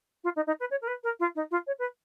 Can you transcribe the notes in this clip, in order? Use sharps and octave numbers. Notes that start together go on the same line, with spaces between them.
F4
D#4
D#4
B4
C#5
A#4
B4
A#4
F4
D#4
F4
C#5
B4